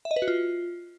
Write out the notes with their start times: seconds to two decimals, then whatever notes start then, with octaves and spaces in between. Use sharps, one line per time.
0.05 E5
0.11 D#5
0.16 B4
0.22 F#4
0.28 F4